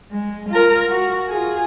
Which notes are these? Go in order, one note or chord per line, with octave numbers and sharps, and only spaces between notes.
G#3
F4 A#4
F#4
F4 G#4